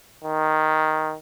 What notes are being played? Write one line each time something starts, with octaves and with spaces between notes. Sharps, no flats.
D#3